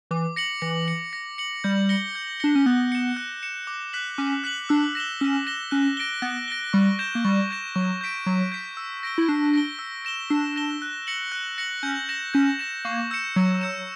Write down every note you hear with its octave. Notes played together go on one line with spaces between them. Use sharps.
E3 D6
A#6 C#7 F#7
E3 A#6
C#7 F#7
A#6
C#7 F#7
G3 G6
A#6 C#7 G7
G6
D4 A#6 C#7 G7
C#4
B3 F#6
C#7 E7
F#6
C#7 E7
D6
F#6 B6 F#7
C#4 D6
F#6 B6 F#7
D4 E6
A#6 E7 G7
C#4 E6
A#6 E7 G7
C#4 F#6
A#6 D7 G7
B3 F#6
A#6 D7 G7
G3 C#6
G6 A#6 E7
A#3
G3 C#6
G6 A#6 E7
F#3 C#6
G6 B6 D7
F#3 C#6
G6 B6 D7
E6
A#6 D7 G7
E4
D4 E6
A#6 D7 G7
E6
A#6 E7 G7
D4 E6
A#6 E7 G7
F#6
A#6 C#7 F#7
F#6
A#6 C#7 F#7
C#4 G6
A#6 E7
C#4 G6
A#6 E7
A#3 C#6
E6 G6 C#7 E7
F#3 C#6
E6 G6 C#7 E7